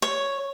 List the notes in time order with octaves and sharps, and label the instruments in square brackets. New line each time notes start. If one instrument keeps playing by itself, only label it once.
[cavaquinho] C#5